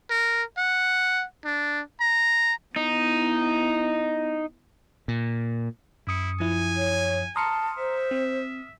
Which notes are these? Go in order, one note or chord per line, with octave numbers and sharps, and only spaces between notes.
A#4
F#5
D4
A#5
B3 D#4 E4
A#2
F#2 E4 D#6 C#7
F3 E4 G#5
C#5
A5 A#5 C6 D#6 F6 C#7
C5 E5
C4